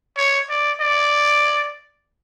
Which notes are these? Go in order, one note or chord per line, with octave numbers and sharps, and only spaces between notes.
C#5
D5
D5